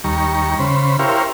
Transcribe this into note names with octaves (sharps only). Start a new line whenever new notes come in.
D#2 G3 A#5 C#6
C#3 C5 B5
E4 G4 A#4 C5 C#5 F5